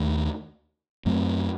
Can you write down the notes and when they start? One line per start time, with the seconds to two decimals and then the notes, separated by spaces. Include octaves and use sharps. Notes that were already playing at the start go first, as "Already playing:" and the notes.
Already playing: D#2 D#3 A3
1.06 F#2 F#3 A3 C4